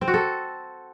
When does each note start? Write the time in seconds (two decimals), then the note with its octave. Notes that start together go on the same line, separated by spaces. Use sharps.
0.01 C4
0.08 F#4
0.14 A4